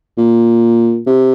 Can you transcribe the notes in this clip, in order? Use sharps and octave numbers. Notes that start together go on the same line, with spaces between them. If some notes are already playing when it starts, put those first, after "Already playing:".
A#2
C3